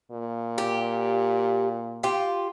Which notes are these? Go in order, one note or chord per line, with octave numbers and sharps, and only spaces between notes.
A#2
G4
F4 G4